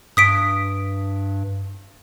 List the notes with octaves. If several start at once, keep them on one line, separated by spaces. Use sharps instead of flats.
G2 D#6 B6 D7